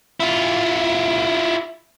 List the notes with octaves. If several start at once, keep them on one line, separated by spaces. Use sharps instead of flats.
E4 F4